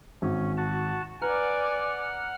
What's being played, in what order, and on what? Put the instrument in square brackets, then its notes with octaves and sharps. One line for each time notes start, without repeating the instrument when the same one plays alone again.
[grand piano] G#1 [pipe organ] C#4
[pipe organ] F#4 A5
[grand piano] B4 A#5 [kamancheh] D5 G#5 [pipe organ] F#5 F6